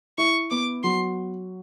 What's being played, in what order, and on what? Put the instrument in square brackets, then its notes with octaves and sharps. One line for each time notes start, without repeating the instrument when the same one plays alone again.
[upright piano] E4 [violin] C#6
[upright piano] B3 [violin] D6
[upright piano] F#3 [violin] C6